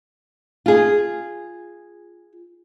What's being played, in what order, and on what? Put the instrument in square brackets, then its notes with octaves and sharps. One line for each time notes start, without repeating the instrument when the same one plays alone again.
[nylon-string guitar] F4 G#4